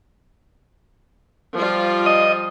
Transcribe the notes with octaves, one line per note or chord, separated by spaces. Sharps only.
F3 G3 F4
D#5